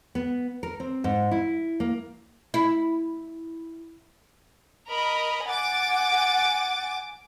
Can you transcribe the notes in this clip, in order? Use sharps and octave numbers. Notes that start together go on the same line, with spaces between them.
B3
A#4
C4
G#2
E4
A#3
E4
A#4 D#5 B5
F#5 G#5 D6 A6